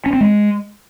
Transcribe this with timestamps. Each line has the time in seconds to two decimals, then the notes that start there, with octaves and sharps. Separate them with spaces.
0.06 C#4
0.13 C4
0.21 G#3